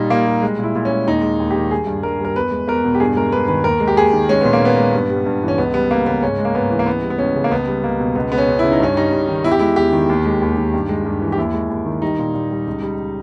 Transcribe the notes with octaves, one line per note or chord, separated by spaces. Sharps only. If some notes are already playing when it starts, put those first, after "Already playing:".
Already playing: A#2 G3 D#4
A#2 A#3
G3
G#3
A#2 E4
A#2
C#4
G#3
D#2 D#4
G#3
D#2
G4
D#3
G3 G#4
G2
G2 A#4
G3 A#4
E2 B4
G#3
E2 A#4
B2
G4
G2 G#4
G#3 A#4
G2 B4
D#3 B4
D#2 A#4
G#3
G4
D#2 G#4
D#3
G#3 C#4
A#2 B3
A#3
A#2 B3
G#3
G2
G3
G2
E3
C#4
C#2 B3
G3 B3
C#2 A#3
C#3 B3
G#2 C#4
G#3
A#3
G#2 B3
E3
A#3
C#2 B3
G3
B3
C#2 C#4
C#3
A#3
C#2 B3
G3
C#2 A#3
B2
C#2 B3
G#3 B3
C#4
C#2
C#3 E4
D#4
G2 C#4
G3 D#4
G2
D#3
E2 E4
G4
G#3 E4
E2 G4
D#3
D#2
G#3
D#2
D#3
G2
G#3
G2
E3
G4
D#2 E4
G#3
D#2
D#3
G3 D#4
A#2
A#2
G3
C#2
G3